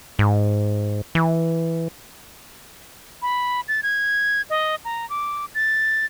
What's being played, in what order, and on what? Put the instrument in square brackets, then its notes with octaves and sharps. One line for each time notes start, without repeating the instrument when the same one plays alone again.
[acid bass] G#2
E3
[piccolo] B5
A6
G#6
D#5
A#5
D6
A6